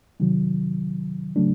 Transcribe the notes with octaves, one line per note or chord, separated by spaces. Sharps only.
C3 D#3 F#3
C#3 F#3 A3 D4